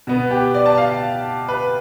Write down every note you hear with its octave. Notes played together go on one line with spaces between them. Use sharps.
B2 B3
G4
D5
A5
F5
B4